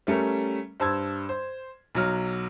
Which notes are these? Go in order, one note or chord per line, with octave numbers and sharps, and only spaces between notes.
G3 A3 C#4 A#4
G2 C5 A5 E6 G#6
C5
B1 F#3 F6